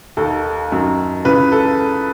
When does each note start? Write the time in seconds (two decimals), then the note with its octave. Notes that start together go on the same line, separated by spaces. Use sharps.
0.17 D#2 D#3 A4
0.72 F#2 D#3
1.25 C#2 C#3 E3 B4
1.52 A4